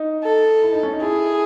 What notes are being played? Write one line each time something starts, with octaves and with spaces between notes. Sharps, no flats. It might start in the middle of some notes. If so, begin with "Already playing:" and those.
Already playing: D#4
A4
E4
D#4
C#4
D#4
E4 G#4